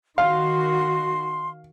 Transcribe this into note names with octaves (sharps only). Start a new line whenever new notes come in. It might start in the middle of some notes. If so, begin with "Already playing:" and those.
D#3 F#4 F5 C6